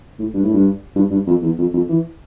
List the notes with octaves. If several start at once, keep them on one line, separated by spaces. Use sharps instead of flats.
A2
G2
A2
G2
G2
G2
F2
E2
F2
F2
E3